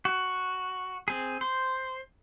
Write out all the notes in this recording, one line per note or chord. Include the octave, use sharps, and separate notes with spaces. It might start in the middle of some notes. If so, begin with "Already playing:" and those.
F#4
C4 G#4
C5